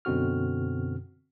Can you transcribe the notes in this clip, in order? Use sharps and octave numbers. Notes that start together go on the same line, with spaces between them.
F#2 B2 D3 C4 F#4 F6